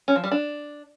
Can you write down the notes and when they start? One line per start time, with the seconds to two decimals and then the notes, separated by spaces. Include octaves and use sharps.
0.08 C#4
0.16 F3
0.24 G3
0.31 D4